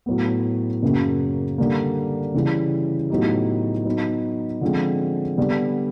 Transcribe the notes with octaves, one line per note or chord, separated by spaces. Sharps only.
A2 F#3 B3
F#2 C#3 F#3 A#3
D3 G3 A#3
C#3 E3 G3
A2 F#3 B3 D#4 G4
F#3 B3 D#4
D3 F3 G#3 C4
D3 G3 B3